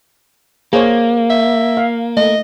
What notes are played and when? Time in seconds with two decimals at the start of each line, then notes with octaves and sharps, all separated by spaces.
0.73 A#3 G#4 C5 C#5
1.30 E5
1.77 F5
2.17 A3 D#5